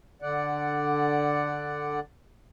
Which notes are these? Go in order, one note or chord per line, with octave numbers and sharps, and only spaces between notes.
D3 D5 F#5